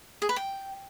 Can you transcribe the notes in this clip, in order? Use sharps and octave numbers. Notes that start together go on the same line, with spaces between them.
G#4
B4
G5